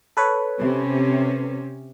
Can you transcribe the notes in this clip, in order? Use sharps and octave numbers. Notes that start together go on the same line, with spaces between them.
A4 B4 C#5
C3 C#4